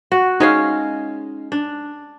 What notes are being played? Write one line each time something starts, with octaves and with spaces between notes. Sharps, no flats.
F#4
G#3 C#4 D#4 F5
D4